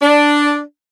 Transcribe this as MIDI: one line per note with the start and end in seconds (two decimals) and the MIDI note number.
0.01 0.59 62